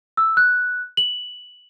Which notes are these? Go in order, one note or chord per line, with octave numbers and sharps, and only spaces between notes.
E6
F#6
F#7